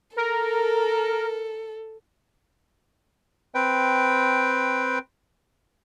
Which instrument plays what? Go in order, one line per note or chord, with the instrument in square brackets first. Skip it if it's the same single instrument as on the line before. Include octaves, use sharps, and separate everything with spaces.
[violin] A4 [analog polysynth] A#4
[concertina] C4 B4 G5